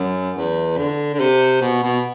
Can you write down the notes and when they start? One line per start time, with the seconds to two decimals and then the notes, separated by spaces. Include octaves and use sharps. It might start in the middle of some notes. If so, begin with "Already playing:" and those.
Already playing: F#2
0.37 E2
0.78 D3
1.15 D3
1.20 C3
1.62 B2
1.83 B2